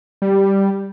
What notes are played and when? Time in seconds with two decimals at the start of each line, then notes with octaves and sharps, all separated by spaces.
0.22 G3